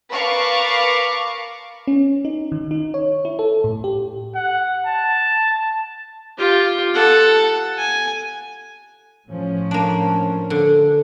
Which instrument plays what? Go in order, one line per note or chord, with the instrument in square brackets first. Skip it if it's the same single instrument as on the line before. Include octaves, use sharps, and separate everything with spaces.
[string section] A#4 B4 F5 A5 C#6 D6
[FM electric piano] C#4
D#4
D#3
D#4
C#5
E4
A4
A2
G4
[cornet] F#5
A5
[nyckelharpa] F4 G4
A4 F#5
G#5
[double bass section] A2 F3 C#4
[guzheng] A#3 D4
D3